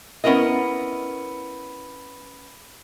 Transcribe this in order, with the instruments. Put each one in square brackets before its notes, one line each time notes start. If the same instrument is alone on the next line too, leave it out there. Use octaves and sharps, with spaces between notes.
[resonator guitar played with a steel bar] B3 C#4 E4 A#4 D#5